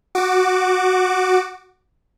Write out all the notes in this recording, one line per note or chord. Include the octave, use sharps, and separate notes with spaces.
F#4 D6